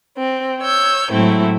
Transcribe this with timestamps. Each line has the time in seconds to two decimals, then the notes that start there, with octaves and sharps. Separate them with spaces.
0.17 C4
0.60 C#5 E6 G6
1.10 A2 F#3 G#3 A3 C4 E4